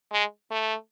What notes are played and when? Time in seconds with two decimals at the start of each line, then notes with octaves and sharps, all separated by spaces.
0.12 G#3
0.51 A3